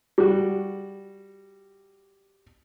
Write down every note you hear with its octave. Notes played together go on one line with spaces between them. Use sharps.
G3 F#4